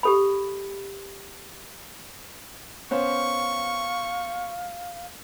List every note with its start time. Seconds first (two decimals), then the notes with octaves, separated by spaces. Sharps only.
0.03 G4 A4 B5
2.91 B3 C#4 C5 F5 C#6